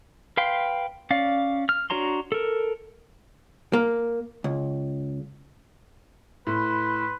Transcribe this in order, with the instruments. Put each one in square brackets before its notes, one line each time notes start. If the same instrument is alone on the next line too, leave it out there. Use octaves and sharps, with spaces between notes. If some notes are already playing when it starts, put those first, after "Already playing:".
[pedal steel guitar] B4 F5 G5 C6
C#4 D5 F5
F6
D4 F#4 C#5 A#5 C6
A4 A#4
[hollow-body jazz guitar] A#3
C#2
[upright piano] A2 [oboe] B4 [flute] C6